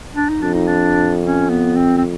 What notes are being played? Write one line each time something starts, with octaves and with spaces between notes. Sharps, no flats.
D4
D#4
F2 D4
D#4
D4
C#4
B3
C4
C4